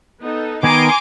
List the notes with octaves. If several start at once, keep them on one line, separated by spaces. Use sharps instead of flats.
B3 D#4 A4
D#3 B3 A#4 G#5 A#5 C6 D6